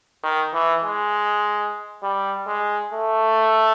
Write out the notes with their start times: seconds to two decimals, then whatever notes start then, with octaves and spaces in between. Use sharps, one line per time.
0.23 D#3
0.53 E3
0.84 G#3
2.03 G3
2.47 G#3
2.93 A3